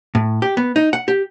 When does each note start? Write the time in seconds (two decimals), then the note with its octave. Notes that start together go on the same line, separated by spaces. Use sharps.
0.15 A2
0.42 G4
0.57 B3
0.76 D#4
0.93 F#5
1.08 G4